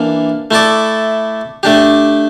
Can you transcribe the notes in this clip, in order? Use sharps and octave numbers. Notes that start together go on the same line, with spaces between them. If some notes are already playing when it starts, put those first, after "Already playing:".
Already playing: E3 A#3 D4
A3 E4 A4 D5
A3 D4 G4